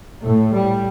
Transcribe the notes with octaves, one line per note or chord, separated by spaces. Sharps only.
A2 A3
G3